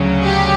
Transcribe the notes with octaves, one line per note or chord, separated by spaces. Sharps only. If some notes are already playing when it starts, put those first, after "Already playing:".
Already playing: D2 C#3 F#3 C#4
G4